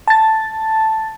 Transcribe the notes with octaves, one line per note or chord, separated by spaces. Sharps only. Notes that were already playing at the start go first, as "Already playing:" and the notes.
A5 A6